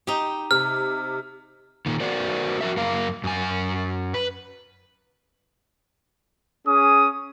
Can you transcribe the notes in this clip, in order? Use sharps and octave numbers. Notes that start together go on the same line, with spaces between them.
D#4 G4
C3 F6
A#2 D#3
F#4 A#4 C5 D5
F#4 A#4 E5
F#2 A#4 F5
F#2 G#5
B4
C#4 G#4 D#6